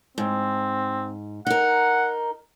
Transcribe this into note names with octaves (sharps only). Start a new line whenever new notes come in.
G#2 C4
D#4 A#4 F#5